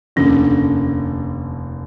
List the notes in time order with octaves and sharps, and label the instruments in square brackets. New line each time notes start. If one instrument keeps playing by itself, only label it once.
[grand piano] F1 D#2 D3 [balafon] C#4